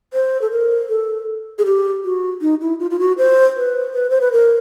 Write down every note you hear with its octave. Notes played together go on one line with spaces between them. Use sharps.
C5
A4
A#4
A4
G#4
G4
F#4
D#4
E4
F4
F4
F#4
C5
B4
B4
C5
B4
A#4